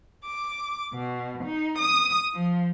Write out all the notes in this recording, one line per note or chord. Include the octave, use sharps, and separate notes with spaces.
D6
B2
D#4
D#6
F3